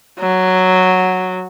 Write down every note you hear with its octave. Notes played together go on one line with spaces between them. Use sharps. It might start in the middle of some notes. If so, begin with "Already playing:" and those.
F#3